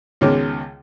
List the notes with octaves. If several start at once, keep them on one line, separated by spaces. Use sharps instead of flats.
C#2 B2 D#3 G#3 C#4 D6